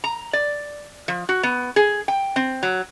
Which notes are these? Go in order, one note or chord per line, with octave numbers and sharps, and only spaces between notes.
A#5
D5
F3
F#4
B3
G#4
G5
C4
F#3